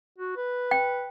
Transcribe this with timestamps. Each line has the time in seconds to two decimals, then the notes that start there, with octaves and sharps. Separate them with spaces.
0.18 F#4
0.37 B4
0.71 G5